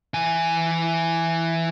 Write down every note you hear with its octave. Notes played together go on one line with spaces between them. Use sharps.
E3 G#5